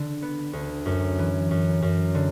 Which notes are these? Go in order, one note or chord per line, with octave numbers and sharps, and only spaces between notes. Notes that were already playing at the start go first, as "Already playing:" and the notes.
Already playing: D3
B3
D2
F#2
E3
F#2
F#2
D3